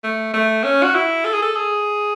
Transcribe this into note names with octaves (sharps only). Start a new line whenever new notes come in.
A3
A3
C#4
F#4
E4
A4
G#4
A4
G#4